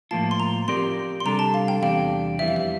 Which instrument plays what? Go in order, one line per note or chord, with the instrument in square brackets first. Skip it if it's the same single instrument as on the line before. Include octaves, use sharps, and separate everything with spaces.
[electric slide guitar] A2 F3 A#3 F4 [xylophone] A5
[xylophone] C6
A#5
[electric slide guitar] F3 C4 G4 A#4 D5 [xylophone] C6
[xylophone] C6
[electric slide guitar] C3 G3 D4 A4 [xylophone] A#5
[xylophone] A5
F5
G5
[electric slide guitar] E2 C3 G3 D4 [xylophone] F5
[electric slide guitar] F2 E3 G3 [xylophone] E5
[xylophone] F5
E5